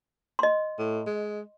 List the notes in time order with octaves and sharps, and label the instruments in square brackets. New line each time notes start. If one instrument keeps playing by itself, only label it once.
[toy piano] D#5 C6
[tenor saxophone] A2
G#3